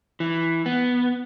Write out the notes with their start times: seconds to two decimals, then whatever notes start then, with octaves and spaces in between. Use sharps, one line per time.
0.20 E3
0.66 B3